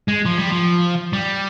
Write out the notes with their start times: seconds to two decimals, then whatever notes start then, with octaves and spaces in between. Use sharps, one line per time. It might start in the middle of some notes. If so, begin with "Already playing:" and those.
0.08 G#3
0.26 F3
0.38 G3
0.50 F3
1.13 G3